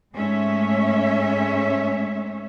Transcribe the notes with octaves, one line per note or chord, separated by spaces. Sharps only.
G#2 G#3 A3 C#4 C#5 E5